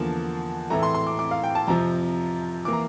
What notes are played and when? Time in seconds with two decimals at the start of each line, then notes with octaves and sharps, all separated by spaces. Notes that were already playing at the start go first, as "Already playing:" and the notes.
Already playing: E2 D3 F3 A#3 A5
0.70 A2 E3 A3 A#5
0.83 C6
0.95 C6
1.07 D6
1.19 D6
1.31 F5
1.44 G5
1.55 A5
1.67 F2 C3 F3 A#5
2.65 E3 A#3 D6
2.73 A#5